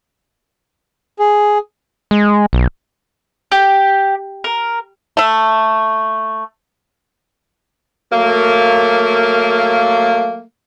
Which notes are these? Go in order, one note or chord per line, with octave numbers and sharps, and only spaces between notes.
G#4
G#3
B1
G4
A#4
A3 E5
F#3 A3 A#3